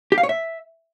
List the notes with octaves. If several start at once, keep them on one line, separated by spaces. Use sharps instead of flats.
G4
F5
C#5
E5